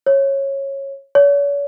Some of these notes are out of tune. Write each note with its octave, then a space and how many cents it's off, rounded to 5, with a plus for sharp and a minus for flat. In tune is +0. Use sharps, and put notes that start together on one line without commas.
C#5 -15
C#5 +40